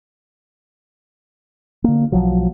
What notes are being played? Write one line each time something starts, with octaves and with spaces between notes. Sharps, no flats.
D3 A#3
B1 F3 F#3